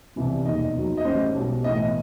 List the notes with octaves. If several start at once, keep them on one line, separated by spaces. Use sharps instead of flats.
C2 C3 E3 G3
E1 D#2 D#3 D#5
D#2 D#3 F#3
D#5
A1 A2 G3 C5
B1 B2 G3
B1 A2 E3 D#5